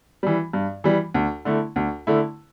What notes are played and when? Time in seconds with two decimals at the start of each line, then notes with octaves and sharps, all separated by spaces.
0.23 E3 G3
0.53 G2
0.84 E3 G3
1.14 D2
1.45 D3 A3 E4
1.76 D2
2.07 D3 A3 E4